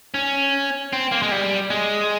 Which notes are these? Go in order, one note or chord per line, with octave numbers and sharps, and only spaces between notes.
C#4
C4
A#3
G#3
G3
G#3